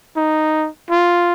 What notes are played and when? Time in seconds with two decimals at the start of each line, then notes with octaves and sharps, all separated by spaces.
0.17 D#4
0.91 F4